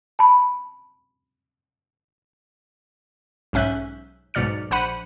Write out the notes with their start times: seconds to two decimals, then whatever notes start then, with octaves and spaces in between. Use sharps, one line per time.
0.19 A5 B5
3.53 B1 G#2 C#4 E5 F#6 G6
4.34 B1 G#2 B2 D5 F6 C#7
4.71 A#1 C5 F#5 B5 D#7